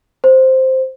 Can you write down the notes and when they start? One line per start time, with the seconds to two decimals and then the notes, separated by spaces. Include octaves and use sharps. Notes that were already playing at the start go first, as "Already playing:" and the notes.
0.24 C5